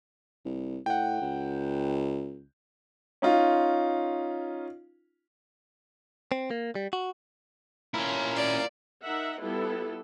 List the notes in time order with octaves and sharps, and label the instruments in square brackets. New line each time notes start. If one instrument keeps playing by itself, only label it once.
[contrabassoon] C2
[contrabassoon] A2 [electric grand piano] F#5 G5
[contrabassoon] C#2
[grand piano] C#4 D#4 F4
[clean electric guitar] C4
A#3
G3
F#4
[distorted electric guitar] C#4 E4 [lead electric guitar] F4 A#4
[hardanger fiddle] D5
[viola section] D#4 A#4 E5 F#5
G3 B3 E4 F4 A4